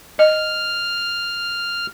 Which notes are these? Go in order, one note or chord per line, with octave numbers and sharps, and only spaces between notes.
D#5 F6